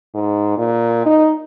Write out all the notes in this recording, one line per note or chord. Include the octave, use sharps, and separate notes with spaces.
G#2
A#2
D#4